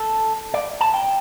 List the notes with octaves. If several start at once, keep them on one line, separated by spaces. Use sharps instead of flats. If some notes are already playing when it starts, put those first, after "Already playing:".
Already playing: A4
D5
A5
G5